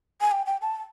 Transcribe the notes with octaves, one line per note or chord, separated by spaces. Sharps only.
G#5
G5
G5
A5